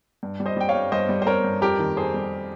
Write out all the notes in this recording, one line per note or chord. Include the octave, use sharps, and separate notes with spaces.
G2
G3
C5 D#5
G3 G5
C#5 F5
G2
G2 C5 D#5
G3
C5
G3 A#4 C#5
G2
F2 G4 A#4
D#3
F2 G#4 C5
G3